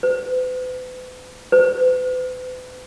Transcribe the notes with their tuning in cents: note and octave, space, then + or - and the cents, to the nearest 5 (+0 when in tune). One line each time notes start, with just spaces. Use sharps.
B4 +45
B4 +45